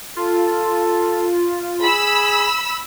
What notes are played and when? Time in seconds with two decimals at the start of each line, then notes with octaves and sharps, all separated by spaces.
0.16 F4 A4
1.82 G#4 B5 E6